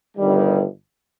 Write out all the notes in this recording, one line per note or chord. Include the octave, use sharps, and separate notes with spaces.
G1 G2 D#3 G3